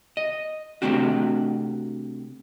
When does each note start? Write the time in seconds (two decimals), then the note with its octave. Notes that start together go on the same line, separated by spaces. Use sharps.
0.17 D#5
0.82 C3 D#3 A3 C4 D4 F#4